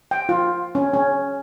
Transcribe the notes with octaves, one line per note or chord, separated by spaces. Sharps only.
G5
F4
C#4
C#4